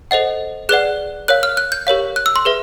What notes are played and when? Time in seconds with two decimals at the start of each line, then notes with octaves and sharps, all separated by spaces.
0.11 A4 C5 D#5 F#5
0.69 G#4 B4 D5 F#5 F#6
1.28 A#4 C#5 F5 F#6
1.43 F6
1.57 F#6
1.72 G6
1.87 G4 A#4 C#5 F5
2.16 F#6
2.26 E6
2.36 C6
2.45 G#4 B4 E5